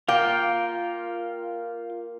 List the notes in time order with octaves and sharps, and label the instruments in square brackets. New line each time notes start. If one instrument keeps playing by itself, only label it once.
[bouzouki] A#3 [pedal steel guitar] F4 G5